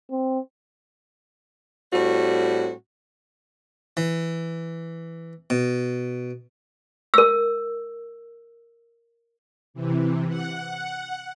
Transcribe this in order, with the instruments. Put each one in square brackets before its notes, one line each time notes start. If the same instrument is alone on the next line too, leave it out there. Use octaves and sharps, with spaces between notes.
[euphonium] C4
[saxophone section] A2 G3 C4 F#4
[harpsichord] E3
B2
[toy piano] A#4 E6
[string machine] C3 E3
F#5